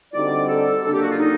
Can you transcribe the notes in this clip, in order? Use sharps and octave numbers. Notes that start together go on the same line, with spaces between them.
D3 G3 C4 D#4 F#4 D5
A4
C#3 F#3 A#3 D4 A4
G4
F#4
F4
D#4